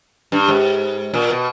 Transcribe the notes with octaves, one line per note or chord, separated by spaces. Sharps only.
G2
G#2
A#2
B2